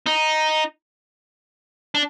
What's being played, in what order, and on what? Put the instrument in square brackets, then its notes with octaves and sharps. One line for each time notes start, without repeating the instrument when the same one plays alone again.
[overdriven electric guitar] D#4
D4